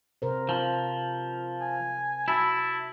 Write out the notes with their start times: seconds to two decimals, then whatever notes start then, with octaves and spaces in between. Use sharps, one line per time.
0.22 C3 A#4 C5
0.49 F3
1.61 G#5
2.28 E4 F#4 A5